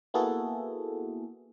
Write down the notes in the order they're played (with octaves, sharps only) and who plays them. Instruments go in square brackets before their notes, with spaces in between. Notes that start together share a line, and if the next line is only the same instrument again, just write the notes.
[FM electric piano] A#3 B3 E4 F#4 G#4 A4